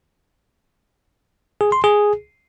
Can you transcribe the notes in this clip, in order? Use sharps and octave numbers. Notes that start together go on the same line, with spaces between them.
G#4
C6
G#4